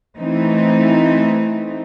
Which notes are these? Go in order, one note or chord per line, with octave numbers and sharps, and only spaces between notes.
E3 A3 C4 D#4